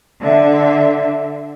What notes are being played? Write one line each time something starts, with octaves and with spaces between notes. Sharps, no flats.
D3 E5